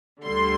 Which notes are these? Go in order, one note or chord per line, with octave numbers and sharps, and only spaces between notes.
D2 D3 G3 C6